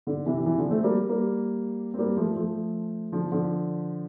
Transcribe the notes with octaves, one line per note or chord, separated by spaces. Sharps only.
D3
C3 E3
C3 E3
D3 F3
A3 C4
G3 A#3
G3 A#3
C4
G3 A#3
F3 A3
F3 A3
D3 F3
D3 F3